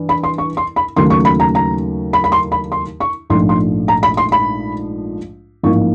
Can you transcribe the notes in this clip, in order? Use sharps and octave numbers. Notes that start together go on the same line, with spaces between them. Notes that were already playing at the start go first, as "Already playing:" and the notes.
Already playing: G2 E3
B5
C6
C#6
C6
B5
D#2 C#3 F#3 A3 C6
C#6
B5
A#5
A#5
B5
B5
C6
B5
C6
C#6
A#1 G#2 F3 A3 C6
C6
A#5
B5
C6
B5
A1 G#2 F3 A#3 C#6